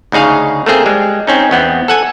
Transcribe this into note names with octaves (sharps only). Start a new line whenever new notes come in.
D2 C#3 D#4 G#4 F5
A3 A#3 C4 G#4
G3 G#3
C4 C#4 D#4
E2 B3 C4
A4 F#5 G#5